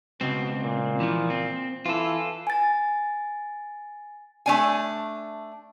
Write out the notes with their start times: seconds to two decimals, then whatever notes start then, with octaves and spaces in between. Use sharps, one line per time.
0.21 C#2 B2 C4
0.62 A#2
1.00 E3 F3
1.30 C4
1.86 E3 F4 A4
2.47 G#5 A6
4.46 A3 D4 G#5